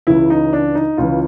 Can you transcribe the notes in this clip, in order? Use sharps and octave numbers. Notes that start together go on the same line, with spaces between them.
C#2 C#3 E3 E4
D#4
D4
D#4
C#2 C#3 E3 F4